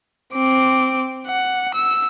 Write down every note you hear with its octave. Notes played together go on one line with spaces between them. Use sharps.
C4 D6
F#5
E6